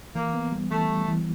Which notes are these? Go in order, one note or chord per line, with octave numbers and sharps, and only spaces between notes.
E3 A#3
B3
G3
E3 A3
G3
E3